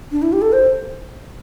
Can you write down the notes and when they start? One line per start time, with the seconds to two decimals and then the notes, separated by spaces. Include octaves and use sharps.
0.12 D4
0.22 E4
0.33 G4
0.42 A4
0.52 C5